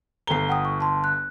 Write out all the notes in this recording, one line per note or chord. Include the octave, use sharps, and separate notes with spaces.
G1 A3 A#5 C7 G7
F#5 G5 D#6
C#6
A5 C6
F#6